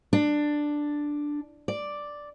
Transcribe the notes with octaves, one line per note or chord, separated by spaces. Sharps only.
D4
D5